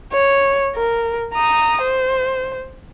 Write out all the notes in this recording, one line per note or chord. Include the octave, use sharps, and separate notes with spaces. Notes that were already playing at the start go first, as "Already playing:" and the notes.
C#5
A#4
A#5 D#6
C5